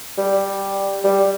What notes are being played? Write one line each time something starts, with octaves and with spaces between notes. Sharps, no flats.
G3
G3